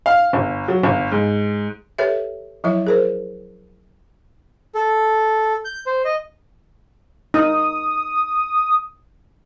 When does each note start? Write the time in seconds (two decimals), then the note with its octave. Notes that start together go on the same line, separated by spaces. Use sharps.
0.06 F5
0.33 G1
0.68 F#3
0.83 G1
1.12 G#2
1.98 G4 A4 B4 C#5 E5
2.64 F3 F#3 E4 C#5 E5
2.87 G#4 A#4 C5
4.75 A4
5.65 G6
5.86 C5
6.05 D#5
7.34 D#4 D#6